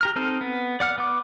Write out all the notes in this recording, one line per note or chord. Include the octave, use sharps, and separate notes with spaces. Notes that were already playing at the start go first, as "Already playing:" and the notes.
G4 A#5 F6
C4 D#4 A4 F6
B3
D5 F#5 F6
B3 D6